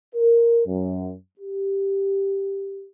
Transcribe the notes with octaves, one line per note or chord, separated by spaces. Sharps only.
A#4
F#2
G4